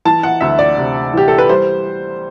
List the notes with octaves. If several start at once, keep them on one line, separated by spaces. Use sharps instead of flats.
E3 A5
F#5
D2 E5
D5
C3
E3 G4
A4
B4
G3 C5